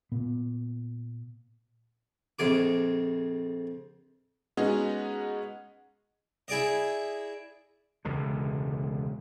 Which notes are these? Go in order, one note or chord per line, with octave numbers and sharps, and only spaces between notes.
A#2 B3
A#1 F2 G#4 D6
G#3 B3 C#4 D#4 F#4
E4 G#4 D5 D#5
E1 C#2 D3